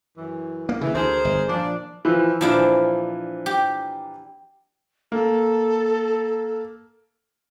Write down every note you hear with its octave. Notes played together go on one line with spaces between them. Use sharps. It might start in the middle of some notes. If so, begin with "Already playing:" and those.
F#2 E3
A#3
C#3 E3
D2 G#4 A#4 C5
G1
A#2 F3 D4
E3 F3
A#2 E3 F3 D4 E4
G4
A#3 A4